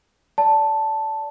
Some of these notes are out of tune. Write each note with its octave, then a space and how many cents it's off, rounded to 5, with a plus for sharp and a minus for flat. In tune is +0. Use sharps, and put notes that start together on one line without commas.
D5 -25 A5 +0